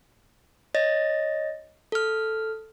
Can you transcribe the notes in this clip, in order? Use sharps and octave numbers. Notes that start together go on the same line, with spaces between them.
C#5 D#5 A6 A#6
A4 F6